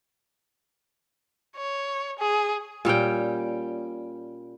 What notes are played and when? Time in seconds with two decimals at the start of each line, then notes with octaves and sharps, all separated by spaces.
1.57 C#5
2.19 G#4
2.85 A#2 G3 C#4 G5